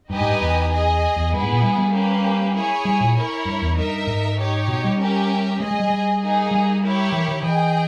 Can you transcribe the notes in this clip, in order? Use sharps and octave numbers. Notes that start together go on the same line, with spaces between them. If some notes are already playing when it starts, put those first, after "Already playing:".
G2 D#4 G4 B4 D#5 G#5
G#2
G2
E2
G#4 D#5 G#5
E2
G2 B3 E4 G#4
G#2
A#2
G3
G3
A#3 C#4 G4 B4
E4 G#4 C#5 G#5
G3
A#2
E4 A#4 C#5
G2
E2
G2 D#4 A#4 E5
G#2
D#4 G4 C#5
B2
G3
C#4 G4 A#4 E5
G#3 G#4 D#5 G#5
G#3
G3
G3
A#3 D#4 G#4
G3
E4 G4 A#4 C#5 E5
E3
D#3
E3 G#4 D#5 G5